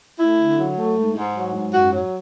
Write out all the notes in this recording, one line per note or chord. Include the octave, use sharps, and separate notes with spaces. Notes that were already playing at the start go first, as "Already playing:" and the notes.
A3 E4
D3
F#3
A3
G#2
G#2
F#3
G#2
F#2 F#4
F#3